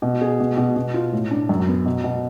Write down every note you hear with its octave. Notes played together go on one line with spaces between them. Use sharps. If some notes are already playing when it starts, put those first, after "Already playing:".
B2
G#4
B2
B2
B2
F4
A2
D4
F#2
B3
B2
B2